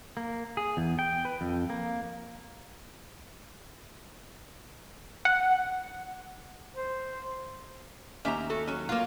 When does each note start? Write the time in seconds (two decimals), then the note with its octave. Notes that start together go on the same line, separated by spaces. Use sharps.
0.17 A#3
0.57 G#4
0.77 E2
0.99 G5
1.25 B4
1.41 F2
1.70 A#3
5.25 F#5
6.76 C5
8.25 D#2 C#4 G4 E5 A#5
8.50 F#4 A4
8.67 F#3 C#4
8.89 A#3 F4